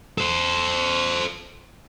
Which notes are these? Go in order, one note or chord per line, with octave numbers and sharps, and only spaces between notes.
A4 C5